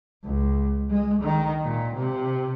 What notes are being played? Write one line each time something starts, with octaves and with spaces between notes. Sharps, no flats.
C#2
G#3
D#3
A#2
C3